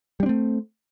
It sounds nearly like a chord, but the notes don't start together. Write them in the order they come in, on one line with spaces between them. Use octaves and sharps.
G3 D4 C4 A3